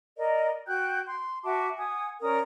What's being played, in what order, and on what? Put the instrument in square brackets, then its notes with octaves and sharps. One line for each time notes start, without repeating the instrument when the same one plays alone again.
[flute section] A#4 D5 D#5
F#4 G5 F#6 G6
C6
F#4 E5 A5 D6
F#5 G#5 D#6
C#4 A#4 D5 D#6